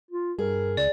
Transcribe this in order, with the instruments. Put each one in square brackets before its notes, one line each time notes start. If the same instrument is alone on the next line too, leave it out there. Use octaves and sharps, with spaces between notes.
[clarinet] F4
[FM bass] G2 [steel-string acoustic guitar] G#4 [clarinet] A#4
[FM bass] C#2 [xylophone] D5